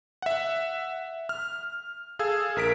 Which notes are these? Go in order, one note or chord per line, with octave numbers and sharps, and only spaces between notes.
E5 F#5
F6
G#4 A4 F5 E6 G#6
A#1 A#4 B6 D7